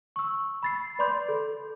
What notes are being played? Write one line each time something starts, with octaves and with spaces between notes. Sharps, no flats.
C#6 E6
B5 A6 C7
B4 D5 B5 C6 D6 G6
A4